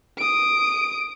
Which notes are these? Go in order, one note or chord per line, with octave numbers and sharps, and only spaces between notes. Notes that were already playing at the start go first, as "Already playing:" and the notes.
D#6 D7